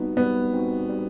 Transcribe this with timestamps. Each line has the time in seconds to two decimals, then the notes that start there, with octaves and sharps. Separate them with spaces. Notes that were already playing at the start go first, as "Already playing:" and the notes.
Already playing: G3 B3 C4 D#4 F#4
0.17 G3 B3
0.53 C4 D#4 F#4
0.89 G3